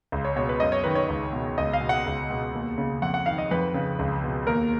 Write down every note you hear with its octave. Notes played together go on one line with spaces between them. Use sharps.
C#2
C#5
B2 C#5
B4
F#2 D#5
C#5
D#3 B4
C#5
C#2
B2
C#2 D#5
F5
B2
F#5
C#2
B2
D#2
C#3
F2 F#5
F#5
D#3 F5
D#5
F2 B4
C#3
C#2
B2
D#2 A#4